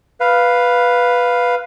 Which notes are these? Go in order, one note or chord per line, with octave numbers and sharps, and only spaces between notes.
B4 F5